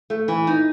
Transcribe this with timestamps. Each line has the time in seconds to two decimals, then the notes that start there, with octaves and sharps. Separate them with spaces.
0.10 A3
0.28 E3
0.47 D#4